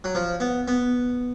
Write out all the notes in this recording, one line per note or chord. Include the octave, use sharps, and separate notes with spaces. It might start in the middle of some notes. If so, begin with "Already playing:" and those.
F#3
F3
B3
B3